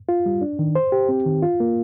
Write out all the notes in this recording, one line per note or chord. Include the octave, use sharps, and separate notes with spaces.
F4
G3
D4
D#3
C5
G4
C4
D#3
F4
A#3